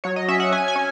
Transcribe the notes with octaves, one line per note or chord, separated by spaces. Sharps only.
F#3 C#5
D#5
C#4 E5
F#5
C#4 G#5
G#5
C#4